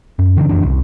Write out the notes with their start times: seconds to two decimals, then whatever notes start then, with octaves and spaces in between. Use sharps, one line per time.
0.19 F#2
0.37 D3 E3 B3 D4
0.49 F2 E3 D4
0.63 C2